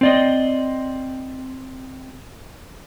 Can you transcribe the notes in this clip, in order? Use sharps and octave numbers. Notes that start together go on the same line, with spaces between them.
C4 D5 D#5